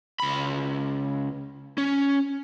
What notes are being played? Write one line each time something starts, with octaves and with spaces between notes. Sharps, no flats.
C#2 B5
C#4